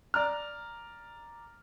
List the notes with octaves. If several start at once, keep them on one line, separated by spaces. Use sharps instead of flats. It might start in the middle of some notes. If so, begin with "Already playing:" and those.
D5 A#5 F6